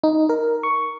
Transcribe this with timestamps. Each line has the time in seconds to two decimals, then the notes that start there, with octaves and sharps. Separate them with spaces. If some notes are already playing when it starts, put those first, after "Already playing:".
0.04 D#4
0.29 A#4
0.63 C#6